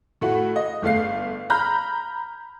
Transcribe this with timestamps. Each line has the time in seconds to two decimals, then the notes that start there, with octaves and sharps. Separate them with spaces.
0.21 A2 A3 F#4
0.56 D#5
0.82 G1 A3 F5 C7
1.50 A#5 B5 F6 G6